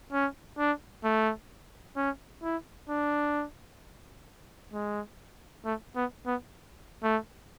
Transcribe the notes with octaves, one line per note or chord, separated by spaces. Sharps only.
C#4
D4
A3
C#4
E4
D4
G#3
A3
B3
B3
A3